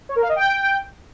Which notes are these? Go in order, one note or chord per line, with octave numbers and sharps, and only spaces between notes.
C#5
A#4
F5
D#5
G5